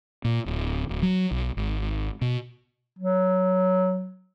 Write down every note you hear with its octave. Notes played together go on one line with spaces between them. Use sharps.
A#2
D1
D1
F#3
B1
G#1
B2
F#3